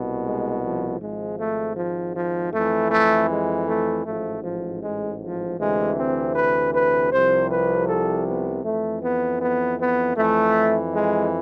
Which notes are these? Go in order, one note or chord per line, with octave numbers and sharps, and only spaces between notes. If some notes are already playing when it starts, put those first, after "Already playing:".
Already playing: C2 B2
G#3
F3
G#1 G#2 F3 G#3
A3
F3
F3
F2 E3 A3
A3
G#3
A3
A1 G#2 F3 A3
F3
G#3
F3
D2 C3 E3 G#3
C4
B4
B4
C2 C3 F3 C5
B4
A4
B3
F2 E3 A3
B3
B3
B3
F2 E3 A3
G#3